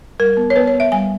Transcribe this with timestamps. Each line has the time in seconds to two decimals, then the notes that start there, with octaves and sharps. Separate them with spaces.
0.19 G3 A#4
0.37 B3
0.50 C#5
0.56 B3 B4
0.68 C#5
0.74 B3
0.80 E5
0.92 G3 G#5